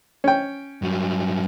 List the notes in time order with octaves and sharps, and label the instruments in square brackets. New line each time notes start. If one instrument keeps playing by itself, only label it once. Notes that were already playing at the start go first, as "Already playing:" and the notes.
[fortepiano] C#4 G5
[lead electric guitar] G2 F#3